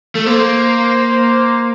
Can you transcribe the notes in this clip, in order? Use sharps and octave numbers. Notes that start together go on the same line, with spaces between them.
A3
A#3 C5